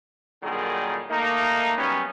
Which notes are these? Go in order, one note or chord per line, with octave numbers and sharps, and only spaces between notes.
A#2 D3 D#3 F#3 G3 G#4
A3 A#3 D#4
F#3 G3 B3 C#4